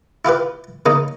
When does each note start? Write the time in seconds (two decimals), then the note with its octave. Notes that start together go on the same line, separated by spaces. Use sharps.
0.25 E4 F4 G4 B4
0.86 C#3 A#3 D#4